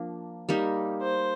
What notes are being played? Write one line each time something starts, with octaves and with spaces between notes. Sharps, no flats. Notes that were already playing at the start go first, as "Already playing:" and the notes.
Already playing: F3 A#3 D4
G3 A#3 D#4 G4
C5